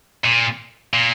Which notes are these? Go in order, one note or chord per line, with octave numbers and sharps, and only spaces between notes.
A#2
A#2